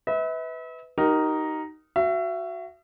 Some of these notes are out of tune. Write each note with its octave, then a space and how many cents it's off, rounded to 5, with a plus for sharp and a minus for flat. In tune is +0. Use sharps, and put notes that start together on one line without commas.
B4 +15 E5 -40
D#4 +0 G4 -45 A#4 +0
F#4 +0 E5 +35